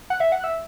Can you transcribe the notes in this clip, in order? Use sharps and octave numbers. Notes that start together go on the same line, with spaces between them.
F#5
E5
F#5
E5